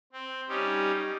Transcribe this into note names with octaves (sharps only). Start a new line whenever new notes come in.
C4
G3 C#4 D#4 G4